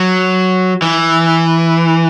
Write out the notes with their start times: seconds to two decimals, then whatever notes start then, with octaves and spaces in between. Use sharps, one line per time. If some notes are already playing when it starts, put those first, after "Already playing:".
Already playing: F#3
0.82 E3